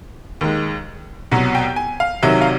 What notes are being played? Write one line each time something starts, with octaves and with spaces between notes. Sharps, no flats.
D#2 D#3 G#3
C2 B2 F#3 F#5
G5
G#5
F5
C2 C3 D#3 F#3 E5
F5